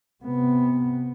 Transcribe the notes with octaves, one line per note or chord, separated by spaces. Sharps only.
C3 B3